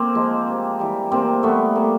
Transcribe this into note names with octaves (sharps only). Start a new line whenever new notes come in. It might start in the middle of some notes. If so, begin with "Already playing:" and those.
Already playing: A#3 C4
F3 G#3
C3
E3 G3
C3 A#3 C4
E3 G3 A3 B3
C3 A#3